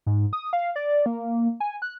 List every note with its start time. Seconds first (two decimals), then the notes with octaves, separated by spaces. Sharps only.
0.06 G#2
0.33 D#6
0.53 F5
0.76 D5
1.06 A#3
1.60 G#5
1.82 F#6